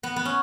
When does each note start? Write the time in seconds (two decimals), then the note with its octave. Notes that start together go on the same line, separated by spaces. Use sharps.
0.03 B3
0.16 B3
0.25 C#4